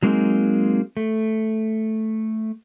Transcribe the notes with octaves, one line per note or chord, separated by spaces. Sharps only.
F#3 G#3 A#3 C4 D#4 G#4
A3